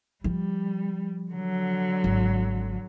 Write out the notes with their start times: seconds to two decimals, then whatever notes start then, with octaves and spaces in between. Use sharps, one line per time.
0.24 F3 G3
1.32 D3 F#3
2.04 G#1